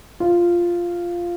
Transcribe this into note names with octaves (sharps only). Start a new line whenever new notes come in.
F4